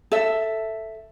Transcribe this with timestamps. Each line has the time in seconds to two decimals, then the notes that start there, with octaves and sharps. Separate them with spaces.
0.12 A4 E5